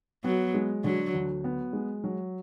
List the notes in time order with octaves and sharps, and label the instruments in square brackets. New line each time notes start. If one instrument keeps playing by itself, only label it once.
[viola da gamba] F#3 [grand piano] B3
[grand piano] G#3
[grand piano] D3 [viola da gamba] F#3
[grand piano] D2
B3
G#3
F#3